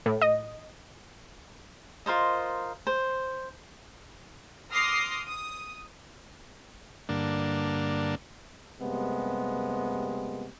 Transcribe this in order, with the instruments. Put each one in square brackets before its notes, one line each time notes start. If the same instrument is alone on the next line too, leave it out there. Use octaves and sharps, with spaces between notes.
[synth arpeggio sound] A2
D#5
[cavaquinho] F4 A#4 C5 D#5
C5
[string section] C6 D6 D#6 F6 A#6 C7
D#6
[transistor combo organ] G2 D3 A#3 D4
[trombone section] F#2 C3 G3 G#3 A#3 B3